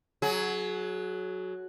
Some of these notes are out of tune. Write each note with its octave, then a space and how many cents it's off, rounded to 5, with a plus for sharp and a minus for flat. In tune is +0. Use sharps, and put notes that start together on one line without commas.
F#3 +0 G#4 +30